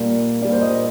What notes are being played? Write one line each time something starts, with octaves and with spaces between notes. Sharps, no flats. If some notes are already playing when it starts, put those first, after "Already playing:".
Already playing: A#2 G3 A#3 D5
A#2 G3 A#3 D5
C5
D#5